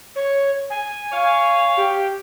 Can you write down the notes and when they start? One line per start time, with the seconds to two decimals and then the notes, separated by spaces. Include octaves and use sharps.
0.16 C#5
0.70 G#5
1.12 C#5 F5
1.77 G4